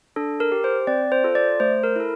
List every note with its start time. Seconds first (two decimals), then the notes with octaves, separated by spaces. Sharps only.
0.16 D4 A4
0.40 A#4
0.52 G4
0.64 C5
0.87 C4 D5
1.12 C5
1.24 F4 A4
1.35 D5
1.60 A3 C5
1.83 A#4
1.96 E4 A4